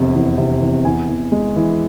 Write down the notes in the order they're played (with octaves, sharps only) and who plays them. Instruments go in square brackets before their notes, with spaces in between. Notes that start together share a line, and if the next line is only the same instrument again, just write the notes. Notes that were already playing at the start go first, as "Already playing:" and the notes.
Already playing: [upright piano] F1 E2 C3
E2
C3
E2
E2 G#5
E2
G#3
E3